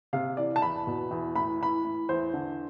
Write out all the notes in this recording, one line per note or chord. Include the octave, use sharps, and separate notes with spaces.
C3 F5
E3 D5
A5
E2 B5
B2
E2
A2 B5
E3 B5
A2
E2 C5
D3